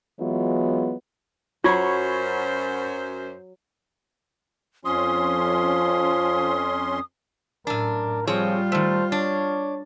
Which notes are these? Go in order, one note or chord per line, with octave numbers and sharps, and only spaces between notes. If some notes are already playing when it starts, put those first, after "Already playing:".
E3 F#3 G#3 B3 E4 F4
F#2 F#3 F4 C5 B5 C#6 G#6
F2 F3 C#4 C6 D#6
F#2 A2 D4 A#4
F3 G3 C4 F4 G#4 C#5
D#3 A3 C5
D4 C#5